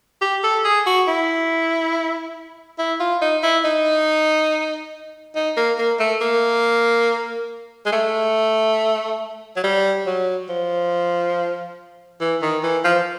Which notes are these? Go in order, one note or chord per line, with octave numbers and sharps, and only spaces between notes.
G4
A4
G#4
F#4
E4
E4
F4
D#4
E4
D#4
D#4
A#3
A#3
A3
A#3
G#3
A3
F#3
G3
F#3
F3
E3
D#3
E3
F3